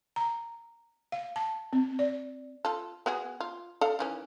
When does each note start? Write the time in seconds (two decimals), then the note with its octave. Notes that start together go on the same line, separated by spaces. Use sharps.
0.16 A#5
1.12 F5
1.36 A5
1.73 C4
1.99 D5
2.65 F4 A4
3.06 B3 F#4 G#4
3.40 F4
3.81 A4 D5 F5
3.99 D#3 E3 C#4